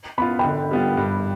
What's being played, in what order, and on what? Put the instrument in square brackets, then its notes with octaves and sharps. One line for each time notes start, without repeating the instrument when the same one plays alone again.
[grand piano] B3 F4 [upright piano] B5
[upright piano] G5 B5
[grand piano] D3
G3 B3 F4
G2